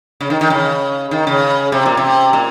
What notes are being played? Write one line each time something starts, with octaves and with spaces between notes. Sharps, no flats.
C#3
D#3
D#3
C#3
D#3
C#3
C3
A#2
C3
A#2